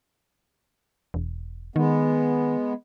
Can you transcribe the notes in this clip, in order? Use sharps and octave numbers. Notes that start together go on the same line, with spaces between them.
E1
D#3 G#3 B3